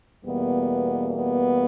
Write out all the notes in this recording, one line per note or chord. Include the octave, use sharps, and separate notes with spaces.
E2 B2 G3 A#3 B3
B3